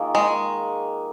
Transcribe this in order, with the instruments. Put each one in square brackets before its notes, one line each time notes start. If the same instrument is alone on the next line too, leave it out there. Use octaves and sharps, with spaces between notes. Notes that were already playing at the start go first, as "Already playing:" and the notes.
Already playing: [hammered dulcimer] D#3 A#3 F4 G#4
[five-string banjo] G#3